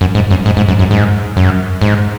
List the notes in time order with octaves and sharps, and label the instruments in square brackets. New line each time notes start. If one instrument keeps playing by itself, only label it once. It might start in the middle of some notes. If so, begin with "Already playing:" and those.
[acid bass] F#2
G#2
F#2
G#2
G#2
F#2
F#2
G#2
F#2
G#2